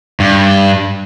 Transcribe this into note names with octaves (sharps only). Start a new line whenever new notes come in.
G2